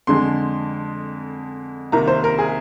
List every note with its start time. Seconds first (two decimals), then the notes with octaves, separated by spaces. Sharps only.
0.07 F2 D3 G#3 C6
1.92 C2 C3 D#3 A#3 A#5
2.08 C5
2.24 A#4
2.39 G#4